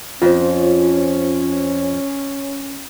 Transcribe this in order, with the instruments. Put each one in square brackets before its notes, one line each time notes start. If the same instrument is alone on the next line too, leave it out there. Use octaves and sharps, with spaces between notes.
[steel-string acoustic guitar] F2 F3 [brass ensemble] C#4 [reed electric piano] F4 C5